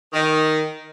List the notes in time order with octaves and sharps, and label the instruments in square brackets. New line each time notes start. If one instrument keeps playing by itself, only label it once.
[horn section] D#3